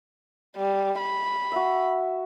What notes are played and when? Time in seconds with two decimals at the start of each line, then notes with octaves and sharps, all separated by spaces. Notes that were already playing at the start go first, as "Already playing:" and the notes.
0.57 G3
1.00 B5
1.52 F#4 E5